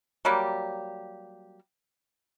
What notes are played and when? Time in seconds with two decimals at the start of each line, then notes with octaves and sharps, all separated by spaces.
0.25 F#3 G3 A#3 G4